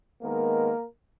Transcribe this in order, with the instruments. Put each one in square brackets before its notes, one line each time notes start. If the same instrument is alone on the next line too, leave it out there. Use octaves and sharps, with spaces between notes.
[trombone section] D#3 G#3 A#3 B3 A#4